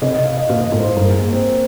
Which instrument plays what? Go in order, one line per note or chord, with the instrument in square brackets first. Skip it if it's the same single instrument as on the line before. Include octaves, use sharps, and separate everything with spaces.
[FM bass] C3 [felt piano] D#5
[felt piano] D#5
F5
D#5
[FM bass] A#2 [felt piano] F5
[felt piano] D#5
[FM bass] G#2
[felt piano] C5
[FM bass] G2 [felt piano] A#4
[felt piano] G#4
A#3
C4